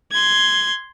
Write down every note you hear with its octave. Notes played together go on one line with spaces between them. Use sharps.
C6 G#6